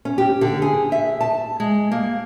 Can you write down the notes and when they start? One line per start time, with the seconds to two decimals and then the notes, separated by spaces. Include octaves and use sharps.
0.05 C#4
0.18 G4
0.41 D3
0.62 G#4
0.92 E5
1.21 A5
1.60 G#3
1.91 A#3